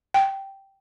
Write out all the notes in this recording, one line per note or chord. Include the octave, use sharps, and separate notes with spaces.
G5